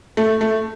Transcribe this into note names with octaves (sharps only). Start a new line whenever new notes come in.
A3
A3